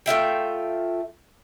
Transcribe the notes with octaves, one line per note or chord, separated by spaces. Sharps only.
A3 F4 E5 G5